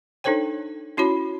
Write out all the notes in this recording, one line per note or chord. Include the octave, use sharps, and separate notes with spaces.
D4 D#4 A4 C5 C#5 G5
C#4 E4 F#4 C#5 B5